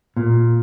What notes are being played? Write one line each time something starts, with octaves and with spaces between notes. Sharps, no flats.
A#2